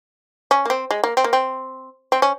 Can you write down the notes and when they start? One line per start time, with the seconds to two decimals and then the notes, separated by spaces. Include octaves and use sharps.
0.51 C#4
0.65 A#3
0.70 C4
0.91 G#3
1.04 A#3
1.17 C4
1.24 A#3
1.33 C4
2.12 C4
2.22 C#4